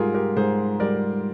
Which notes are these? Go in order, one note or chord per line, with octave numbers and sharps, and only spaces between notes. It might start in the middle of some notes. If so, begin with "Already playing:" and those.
Already playing: G#2 G3 F4 G4 G#4 A#4
G4 A#4
G#2 G#4 C5
G3 A#4 D5